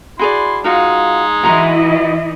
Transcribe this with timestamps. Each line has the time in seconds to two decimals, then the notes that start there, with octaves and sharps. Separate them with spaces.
0.19 E4 F#4 G#4 D5 C6
0.64 G#3 D#4 F4 F#4 F5
1.44 E3 E4 F#4 D#5 A#5 C6